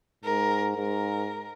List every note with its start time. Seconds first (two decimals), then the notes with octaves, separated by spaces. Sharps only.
0.24 G#2 A#4
0.76 G#2 A#4